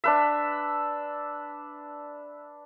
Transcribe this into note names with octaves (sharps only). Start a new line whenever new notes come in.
D4 B4 E5